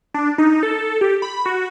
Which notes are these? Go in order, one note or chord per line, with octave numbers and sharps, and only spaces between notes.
D4
D#4
A4
G4
B5
F#4